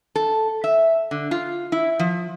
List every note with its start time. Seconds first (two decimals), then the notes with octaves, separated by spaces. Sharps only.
0.16 A4
0.64 E5
1.11 D3
1.31 F4
1.72 E4
1.99 F3